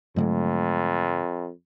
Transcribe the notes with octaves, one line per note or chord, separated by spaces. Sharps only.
F2 G#2 D3 F#3 G#3 A3